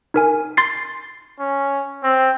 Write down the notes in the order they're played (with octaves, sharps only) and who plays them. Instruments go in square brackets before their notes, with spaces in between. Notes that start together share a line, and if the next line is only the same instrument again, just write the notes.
[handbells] D#4 A#4 G#5
C6 A6 C7
[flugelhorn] C#4
C4